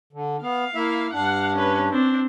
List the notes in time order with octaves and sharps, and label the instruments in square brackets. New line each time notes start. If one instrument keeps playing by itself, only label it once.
[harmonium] D3
[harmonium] B3 [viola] F5
[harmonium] A#3 E4 E5
[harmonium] G2 D4 [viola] F5 F#5
[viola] C#4 B4
C4 D4